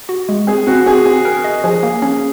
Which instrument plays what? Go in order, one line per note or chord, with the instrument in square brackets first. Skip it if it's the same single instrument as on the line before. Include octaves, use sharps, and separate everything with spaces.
[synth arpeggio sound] F#4
G#3
[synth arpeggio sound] C4 [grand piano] G#4
[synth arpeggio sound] C4 [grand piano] F#4
[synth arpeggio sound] C4 [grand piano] G#4
[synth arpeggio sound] C4 [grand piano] G#4
[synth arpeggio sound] A#4
D#5
[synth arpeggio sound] F3 [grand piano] G#4
[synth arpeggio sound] A#3
C#4